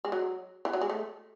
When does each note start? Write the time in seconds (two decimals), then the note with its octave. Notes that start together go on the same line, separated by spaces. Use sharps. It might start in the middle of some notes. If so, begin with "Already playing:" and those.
0.05 G#3
0.12 F#3
0.65 E3
0.73 F#3
0.81 G#3
0.90 A3